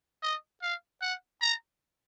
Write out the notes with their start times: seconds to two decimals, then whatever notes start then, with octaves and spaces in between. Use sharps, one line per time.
0.23 D#5
0.62 F5
1.02 F#5
1.41 A#5